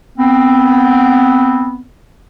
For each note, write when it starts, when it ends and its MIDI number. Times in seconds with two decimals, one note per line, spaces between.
0.18 1.82 59
0.18 1.82 60